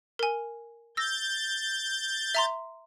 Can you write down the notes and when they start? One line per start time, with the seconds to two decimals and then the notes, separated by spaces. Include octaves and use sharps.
0.19 A#4 G#5
0.97 E6 G6 A6 A#6
2.35 E5 A#5 C6